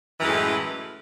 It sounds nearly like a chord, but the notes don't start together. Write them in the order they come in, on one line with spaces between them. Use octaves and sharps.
E3 F#2 G#3 A2